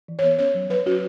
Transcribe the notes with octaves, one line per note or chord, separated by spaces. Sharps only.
E3
B3 C#5
C#4 C#5
F#3
F#3 B4
C#4 F#4